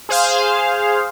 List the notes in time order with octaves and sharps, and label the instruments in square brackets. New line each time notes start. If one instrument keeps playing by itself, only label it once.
[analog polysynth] G#4 C5 F5